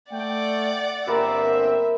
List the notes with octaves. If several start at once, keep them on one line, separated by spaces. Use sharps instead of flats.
A3 D5 F#5 G5
G1 A#3 C4 A#4 B4 E5